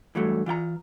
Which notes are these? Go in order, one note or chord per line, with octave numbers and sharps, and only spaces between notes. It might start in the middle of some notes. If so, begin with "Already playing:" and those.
G2 E3 F#3 A3
E3 F4 G5 A#5